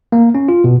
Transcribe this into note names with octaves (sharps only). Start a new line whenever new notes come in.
A#3
C#4
F4
B2